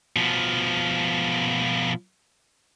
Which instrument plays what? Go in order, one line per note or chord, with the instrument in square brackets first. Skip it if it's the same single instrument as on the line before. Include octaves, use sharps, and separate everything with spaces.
[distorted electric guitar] B2 F3